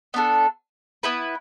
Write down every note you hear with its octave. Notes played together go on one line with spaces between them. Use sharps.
B3 D4 A4
B3 E4 B4